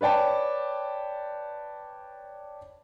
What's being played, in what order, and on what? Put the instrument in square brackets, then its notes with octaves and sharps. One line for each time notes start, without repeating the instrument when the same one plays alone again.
[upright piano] B4 C#5 D5 G5 A5